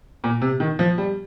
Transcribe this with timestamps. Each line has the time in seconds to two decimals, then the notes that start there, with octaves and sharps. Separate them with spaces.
0.24 A#2
0.41 C3
0.60 D#3
0.79 F3
0.98 G3